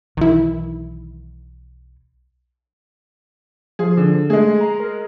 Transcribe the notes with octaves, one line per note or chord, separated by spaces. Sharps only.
B1 D#3 E3 E4
F3 G#4
D3
G#3 A3 G#4
A#5
A#4